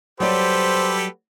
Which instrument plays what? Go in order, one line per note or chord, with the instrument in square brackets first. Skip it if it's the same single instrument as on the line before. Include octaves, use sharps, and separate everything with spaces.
[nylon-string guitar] F#3 G3 D5 [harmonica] G4 A4 B4 [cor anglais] C5